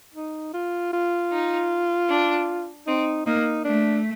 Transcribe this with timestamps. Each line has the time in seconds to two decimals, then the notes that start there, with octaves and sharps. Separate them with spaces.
0.14 D#4
0.54 F4
0.93 F4
1.31 D#4
2.09 D4
2.87 C4 D#4
3.26 A#3 D#4
3.65 A3 D4